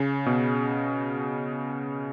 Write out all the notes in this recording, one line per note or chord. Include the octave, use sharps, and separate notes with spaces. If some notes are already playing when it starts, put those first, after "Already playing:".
Already playing: C#3
B2